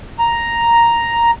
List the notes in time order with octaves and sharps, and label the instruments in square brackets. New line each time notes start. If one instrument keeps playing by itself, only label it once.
[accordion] A#5